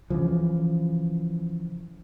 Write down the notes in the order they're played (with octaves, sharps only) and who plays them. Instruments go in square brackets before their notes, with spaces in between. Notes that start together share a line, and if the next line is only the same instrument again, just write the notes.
[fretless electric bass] C#3 E3 F3